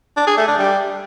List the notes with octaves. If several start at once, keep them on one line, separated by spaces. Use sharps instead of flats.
D4
G#4
A3
D4
G3